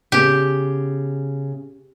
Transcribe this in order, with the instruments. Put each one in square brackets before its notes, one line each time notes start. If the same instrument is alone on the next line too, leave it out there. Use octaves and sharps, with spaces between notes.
[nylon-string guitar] C#3 B3 [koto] G4